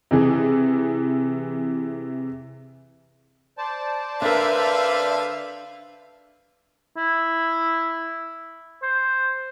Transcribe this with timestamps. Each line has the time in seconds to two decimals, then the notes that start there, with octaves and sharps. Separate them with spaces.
0.11 C3 E3 G#4
3.58 C5 D5 A5
4.22 D3 D4 A#4 B4 E5 F5
6.97 E4
8.82 C5